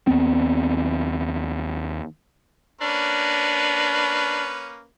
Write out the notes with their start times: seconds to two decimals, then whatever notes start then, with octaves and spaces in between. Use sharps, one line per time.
0.07 D#2 B3 C4
2.81 A#3 C#4 D4 B4